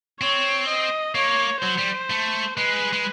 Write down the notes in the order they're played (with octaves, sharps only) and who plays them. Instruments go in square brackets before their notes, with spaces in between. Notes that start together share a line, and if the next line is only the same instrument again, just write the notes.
[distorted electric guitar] C4 [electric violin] C#5
[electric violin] D#5
[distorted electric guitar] A#3 [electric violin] C#5
[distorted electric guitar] F#3 [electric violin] C5
[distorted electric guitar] G3
A3
[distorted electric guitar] G#3 [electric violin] B4
[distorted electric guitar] G#3